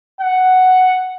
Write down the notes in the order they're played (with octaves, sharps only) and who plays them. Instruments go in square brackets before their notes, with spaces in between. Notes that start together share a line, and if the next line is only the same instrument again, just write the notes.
[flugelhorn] F#5